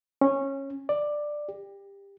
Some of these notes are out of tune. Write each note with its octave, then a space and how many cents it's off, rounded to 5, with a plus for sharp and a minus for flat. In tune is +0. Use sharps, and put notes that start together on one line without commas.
C#4 -15
D5 +10
G4 +20